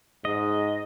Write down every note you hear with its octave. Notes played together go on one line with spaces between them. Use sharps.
G#2 D#5